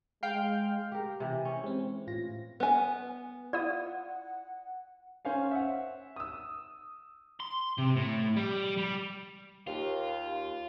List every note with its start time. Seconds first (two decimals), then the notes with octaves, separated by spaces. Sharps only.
0.23 G#3 F5 G5
0.92 G4 A#4
1.20 C3 E3
1.45 C#4
1.63 G#3 C4
2.07 A2 F4 A#6
2.60 B3 G#5
3.53 E4 F4 D5 F#5 D#6
5.25 C#4 C5 F5 G#5
5.51 E5 F#5
6.16 D#6 E6
7.40 C6
7.78 C3
7.97 A2
8.37 G3
8.78 G3
9.67 D#2 F4